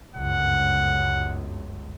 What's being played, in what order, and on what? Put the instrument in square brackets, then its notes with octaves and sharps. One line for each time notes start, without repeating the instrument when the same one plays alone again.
[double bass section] G1 C#2 F#2 [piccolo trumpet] F#5